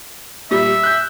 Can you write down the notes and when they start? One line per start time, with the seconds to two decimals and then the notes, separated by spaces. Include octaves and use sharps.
0.51 A#2 G3 E5
0.83 F#6 G6